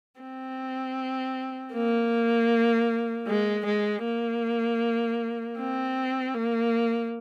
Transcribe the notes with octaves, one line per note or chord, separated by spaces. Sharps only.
C4
A#3
G#3
G#3
A#3
C4
A#3